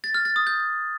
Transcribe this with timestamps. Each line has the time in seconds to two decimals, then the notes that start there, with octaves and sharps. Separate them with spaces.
0.04 A6
0.14 F6
0.25 A6
0.36 D#6
0.47 G6